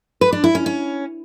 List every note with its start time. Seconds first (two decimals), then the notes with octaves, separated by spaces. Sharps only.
0.21 B4
0.32 D4
0.44 E4
0.55 C#4
0.66 C#4